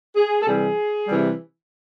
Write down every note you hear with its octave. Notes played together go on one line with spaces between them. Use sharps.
G#4
A4
C3 E3 G3 G#4
C3 E3 G3